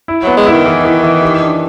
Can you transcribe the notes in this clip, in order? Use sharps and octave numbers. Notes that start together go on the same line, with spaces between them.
E4
F#3 B3
G#3
E4
D#3
E3
E3
E3
G4
D4